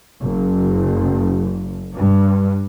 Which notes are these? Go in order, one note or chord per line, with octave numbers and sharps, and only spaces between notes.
F#1
G2